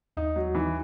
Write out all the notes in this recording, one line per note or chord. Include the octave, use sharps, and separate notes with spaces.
D#2 D#4
F#3
E3 D#4